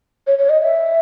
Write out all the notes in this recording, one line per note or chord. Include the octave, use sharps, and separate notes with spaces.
C#5
C#5
D#5
E5